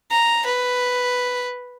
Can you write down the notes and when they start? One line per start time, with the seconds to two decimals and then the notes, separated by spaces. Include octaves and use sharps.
0.11 A#5
0.46 B4